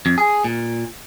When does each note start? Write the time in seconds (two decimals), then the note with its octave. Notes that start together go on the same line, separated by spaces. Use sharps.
0.06 F2
0.18 G#4
0.44 A#2